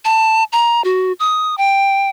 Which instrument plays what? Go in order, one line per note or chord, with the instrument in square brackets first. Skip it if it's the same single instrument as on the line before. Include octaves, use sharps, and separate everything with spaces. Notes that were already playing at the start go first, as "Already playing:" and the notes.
[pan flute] A5
A#5
F#4
D#6
G5